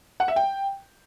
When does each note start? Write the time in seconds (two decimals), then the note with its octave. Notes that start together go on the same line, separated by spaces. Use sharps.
0.20 F#5
0.28 E5
0.36 G5